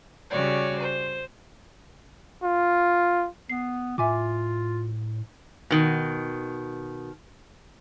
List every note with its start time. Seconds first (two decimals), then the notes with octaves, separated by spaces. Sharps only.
0.29 C#3 G3 F#4 C#5 D5
0.79 C5
2.44 F4
3.49 B3 C7
3.98 A2 F4 E5 G#5 D6
5.70 B2 D#3